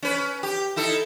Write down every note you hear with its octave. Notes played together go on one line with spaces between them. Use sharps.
C#4 B4
G4
D#4 E4 A4